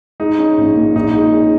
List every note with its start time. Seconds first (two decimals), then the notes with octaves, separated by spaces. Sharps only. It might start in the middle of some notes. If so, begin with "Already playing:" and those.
0.20 G#3 D#4
0.39 C#4
0.58 A#1
0.77 A#2
0.95 A#1 D#4
1.15 G#3
1.33 C#4